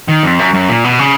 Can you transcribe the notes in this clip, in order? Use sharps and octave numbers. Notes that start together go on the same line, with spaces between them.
D#3
F2
F#2
F#2
A#2
B2
C#3